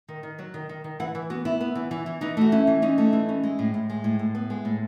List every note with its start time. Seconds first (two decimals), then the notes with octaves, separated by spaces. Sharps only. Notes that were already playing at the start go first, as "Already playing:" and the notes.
0.08 D#3
0.23 D#3
0.39 F#3
0.54 D#3
0.69 D#3
0.84 D#3
1.00 E3 F#5
1.15 E3
1.30 B3 F#4
1.45 B3 E4
1.61 B3
1.75 E3
1.91 E3
2.06 E3
2.21 E3 D#4
2.37 A3 F#4
2.52 C#4 E4
2.67 E3
2.82 C#4 D#4
2.98 A3
3.13 E3
3.29 C#4
3.43 G#3
3.59 A2
3.74 A2
3.90 G#3
4.04 A2
4.19 A2
4.35 B3
4.50 G#3
4.65 A2